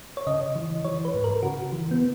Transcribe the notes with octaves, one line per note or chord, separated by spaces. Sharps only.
C#5
C#3 D#5
E3
E3 C#5
B4
G#2
A#4
C#3 F#4
E3
B3